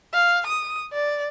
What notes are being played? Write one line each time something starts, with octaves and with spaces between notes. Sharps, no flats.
F5
D#6
D5